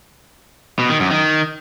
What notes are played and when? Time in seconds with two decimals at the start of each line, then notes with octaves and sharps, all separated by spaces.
0.79 B2
0.90 D#3
1.00 F#2
1.11 D#3